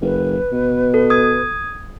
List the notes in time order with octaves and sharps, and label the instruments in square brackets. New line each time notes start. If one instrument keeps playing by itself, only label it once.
[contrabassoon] F#1 [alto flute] B4
[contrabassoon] B2
[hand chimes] A4
D#6 G#6